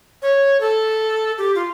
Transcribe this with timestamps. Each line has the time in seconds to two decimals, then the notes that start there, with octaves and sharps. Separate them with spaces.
0.22 C#5
0.61 A4
1.38 G4
1.55 F4